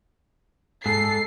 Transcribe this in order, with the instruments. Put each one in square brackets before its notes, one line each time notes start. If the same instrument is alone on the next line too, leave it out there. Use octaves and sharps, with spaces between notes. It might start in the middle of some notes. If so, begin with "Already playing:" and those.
[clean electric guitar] G#2 [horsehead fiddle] A4 [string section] C7